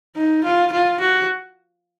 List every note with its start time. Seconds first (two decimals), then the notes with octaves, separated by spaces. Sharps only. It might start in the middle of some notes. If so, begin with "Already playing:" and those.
0.16 D#4
0.44 F4
0.72 F4
1.00 F#4